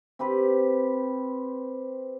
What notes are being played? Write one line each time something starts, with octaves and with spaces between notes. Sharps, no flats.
C4 G4 B4